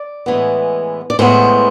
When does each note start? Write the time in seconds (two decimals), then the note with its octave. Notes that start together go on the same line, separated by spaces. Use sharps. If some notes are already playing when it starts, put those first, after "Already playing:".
Already playing: D5
0.26 A2 E3 G#3 B3
1.10 D5
1.19 A2 G#3 B3 C5